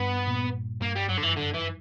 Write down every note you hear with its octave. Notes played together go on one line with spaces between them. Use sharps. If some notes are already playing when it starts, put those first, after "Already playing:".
Already playing: G2 B3
A#2
G2 A#3
G3
F#2 F#3
D3
E3
D3
E3